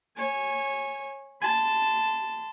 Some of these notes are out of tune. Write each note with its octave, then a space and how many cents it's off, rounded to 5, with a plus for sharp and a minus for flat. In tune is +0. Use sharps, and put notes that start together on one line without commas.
C#5 -20 G#5 +0
A5 +0 C6 -30